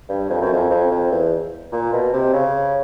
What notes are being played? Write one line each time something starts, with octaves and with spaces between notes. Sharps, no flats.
G2
F2
F#2
F2
F2
F2
E2
A#2
B2
C3
C#3